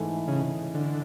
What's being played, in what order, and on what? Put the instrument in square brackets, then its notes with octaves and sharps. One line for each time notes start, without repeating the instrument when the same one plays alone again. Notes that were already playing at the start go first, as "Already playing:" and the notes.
Already playing: [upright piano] G#2 E3 A3
[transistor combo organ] C#3
D3